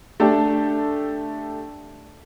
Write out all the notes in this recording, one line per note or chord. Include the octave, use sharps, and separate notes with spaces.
A3 D4 G4 A4